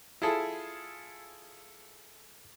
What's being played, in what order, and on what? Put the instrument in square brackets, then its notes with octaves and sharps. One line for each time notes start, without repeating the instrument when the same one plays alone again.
[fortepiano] E4 F4 G#4 A4